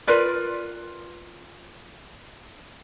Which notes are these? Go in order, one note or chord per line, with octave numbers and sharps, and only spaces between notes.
F4 A#4 B4 D5